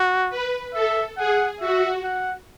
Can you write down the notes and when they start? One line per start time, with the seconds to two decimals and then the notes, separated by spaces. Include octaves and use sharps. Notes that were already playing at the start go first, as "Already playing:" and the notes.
Already playing: F#4
0.30 B4
0.73 A4 E5
1.17 G#4 F#5
1.60 F#4 E5
2.04 F#5